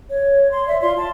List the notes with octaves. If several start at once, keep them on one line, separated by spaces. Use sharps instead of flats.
C#5
C6
D5 E5
F4 C6
A5